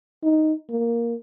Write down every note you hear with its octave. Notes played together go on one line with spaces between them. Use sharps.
D#4
A#3